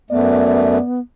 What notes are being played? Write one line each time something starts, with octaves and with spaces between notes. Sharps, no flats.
F#2 A3 B3 D5